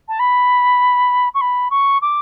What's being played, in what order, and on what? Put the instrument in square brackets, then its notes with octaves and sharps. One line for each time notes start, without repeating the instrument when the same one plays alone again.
[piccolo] A5
B5
C#6
B5
C#6
D6